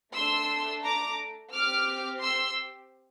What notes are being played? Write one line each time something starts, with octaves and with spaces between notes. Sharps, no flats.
A3 D4 A4 C6 E6
A#5 D6
C4 G4 D6 F6
C6 E6